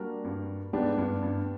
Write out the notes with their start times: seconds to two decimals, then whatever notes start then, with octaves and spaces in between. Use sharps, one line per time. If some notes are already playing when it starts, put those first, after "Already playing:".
Already playing: G3 A#3 D4 F#4 A#4
0.24 G2
0.73 G#2 G3 B3 D4 G4
0.98 G2
1.23 G2